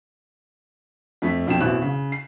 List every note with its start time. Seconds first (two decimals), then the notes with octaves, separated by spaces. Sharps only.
1.22 F2 A3 B6
1.47 B1 F2 G5 E7
1.60 A1 B2 E3 C4 F#6 E7
1.82 C#3
2.12 C7